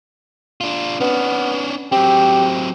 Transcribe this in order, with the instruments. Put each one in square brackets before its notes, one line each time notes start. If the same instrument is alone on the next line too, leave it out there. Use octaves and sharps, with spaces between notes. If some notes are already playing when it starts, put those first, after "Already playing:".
[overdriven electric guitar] D4 F4
[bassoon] B3 [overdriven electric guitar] C#4 D4
[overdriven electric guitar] F#3 C4 [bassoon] G4